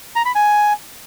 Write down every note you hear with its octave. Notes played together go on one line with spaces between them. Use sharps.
A#5
B5
G#5